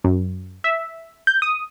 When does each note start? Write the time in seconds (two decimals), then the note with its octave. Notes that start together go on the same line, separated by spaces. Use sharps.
0.04 F#2
0.64 E5
1.27 G6
1.42 D#6